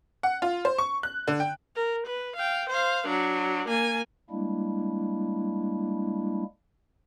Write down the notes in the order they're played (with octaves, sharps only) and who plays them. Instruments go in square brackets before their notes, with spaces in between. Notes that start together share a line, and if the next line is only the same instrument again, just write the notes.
[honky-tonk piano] F#5
F4
C5
C#6
F#6
D3
G5
[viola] A#4
B4
F5 G5
C5 F5
F#3 D4
A#3 G#5
[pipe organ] G3 G#3 A#3 D4 E4